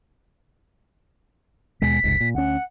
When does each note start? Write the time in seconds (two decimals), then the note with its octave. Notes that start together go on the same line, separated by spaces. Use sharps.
1.82 D#2 B2 G#3 B6
2.04 F1 C#2 G#2
2.21 A#2
2.35 D2 C#4 F#5